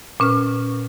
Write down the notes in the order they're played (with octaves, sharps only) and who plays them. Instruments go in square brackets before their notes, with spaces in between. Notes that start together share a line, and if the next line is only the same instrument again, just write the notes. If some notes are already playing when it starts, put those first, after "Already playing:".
[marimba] A#2 C#4 B4 F6